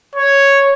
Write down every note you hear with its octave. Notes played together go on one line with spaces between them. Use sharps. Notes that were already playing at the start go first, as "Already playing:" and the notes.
C#5